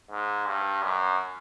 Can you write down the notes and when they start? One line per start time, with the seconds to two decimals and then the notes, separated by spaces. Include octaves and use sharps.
0.10 G#2
0.46 G2
0.83 F#2